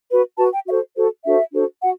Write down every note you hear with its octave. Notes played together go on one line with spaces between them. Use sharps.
F#4 B4
F#4 B4 A5
G5
F#4 A4 C5 E5
F#4 A4 C5
D4 F#4 A4 C5 E5
D4 F#4 A4 C5
F#4 F#5